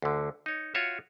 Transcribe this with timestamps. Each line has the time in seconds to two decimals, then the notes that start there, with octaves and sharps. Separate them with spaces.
0.02 D2 D3
0.46 D#4 C#5
0.74 F4 F#4 C#5 E5